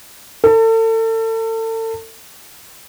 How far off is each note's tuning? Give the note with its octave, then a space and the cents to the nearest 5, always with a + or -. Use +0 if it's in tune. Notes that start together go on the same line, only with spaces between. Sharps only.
A4 +35